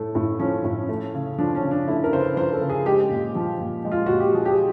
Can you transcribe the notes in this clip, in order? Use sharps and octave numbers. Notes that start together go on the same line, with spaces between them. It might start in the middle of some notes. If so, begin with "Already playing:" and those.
Already playing: A2 A3
A2
F3 C#4
A2
A3
C#3
F3 D4
C#4
C#3
D4
A3 E4
A#4
C#3 C5
B4
F3 C5
A4
C#3
G#4
G#3 G4
A#2
F3
A#2
G#3
F4
A#2 F#4
G4
F3 G#4
G4
G#4